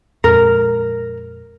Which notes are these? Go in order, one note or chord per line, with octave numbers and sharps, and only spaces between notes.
F2 A#2 G#3 A#4